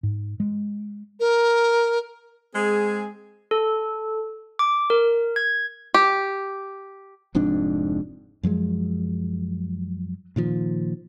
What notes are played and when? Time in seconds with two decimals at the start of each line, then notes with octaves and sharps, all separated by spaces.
0.03 G#2
0.40 G#3
1.20 A#4
2.54 G#3 C4 G#4
3.51 A4
4.59 D6
4.90 A#4
5.36 G#6
5.94 G4
7.35 F1 F2 G#2 D4
8.43 F#2 F3 F#3 G#3
10.36 A#2 D#3 F3